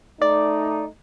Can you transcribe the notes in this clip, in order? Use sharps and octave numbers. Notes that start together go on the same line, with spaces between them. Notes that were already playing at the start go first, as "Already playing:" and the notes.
A3 D#4 D5